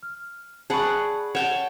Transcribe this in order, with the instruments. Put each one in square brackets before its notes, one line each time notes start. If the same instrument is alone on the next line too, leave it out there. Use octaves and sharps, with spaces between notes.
[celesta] F6
[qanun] G#4 D5 F#5 [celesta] A5 B5 C#6
[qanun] C#5 G5 A5 [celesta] F#5 E7